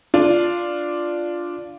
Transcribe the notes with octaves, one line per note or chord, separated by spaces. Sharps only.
D4 F4